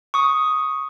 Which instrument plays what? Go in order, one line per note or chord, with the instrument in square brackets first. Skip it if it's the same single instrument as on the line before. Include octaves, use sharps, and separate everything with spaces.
[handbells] C#6 D#6